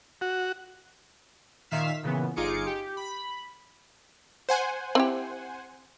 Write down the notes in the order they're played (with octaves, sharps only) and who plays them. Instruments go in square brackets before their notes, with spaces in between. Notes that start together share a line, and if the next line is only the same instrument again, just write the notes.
[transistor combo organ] F#4
[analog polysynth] A#2 D#3 E5 F5 B6 E7
A#2 C#3 E3 B3
G1 D#4 F4 G#4 D6 C#7
G4
B5
[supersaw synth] C5 F#5 G#5
[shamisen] C4 E4 G4